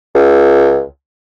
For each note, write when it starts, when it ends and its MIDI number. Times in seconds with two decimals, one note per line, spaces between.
0.15 0.83 37